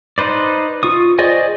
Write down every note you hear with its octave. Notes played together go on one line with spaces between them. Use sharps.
D#4 B4 C5 D5
F4 C#6 D#6
G#4 C5 D5 D#5 G#5